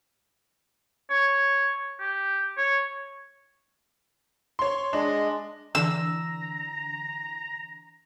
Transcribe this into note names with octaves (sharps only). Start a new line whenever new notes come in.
C#5
G4
C#5
C#5 C6
G#3 D4 D#5
D3 E3 D4 A#5 E6